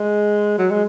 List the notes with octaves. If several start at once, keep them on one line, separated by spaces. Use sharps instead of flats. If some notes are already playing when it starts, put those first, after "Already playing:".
Already playing: G#3
F#3
G#3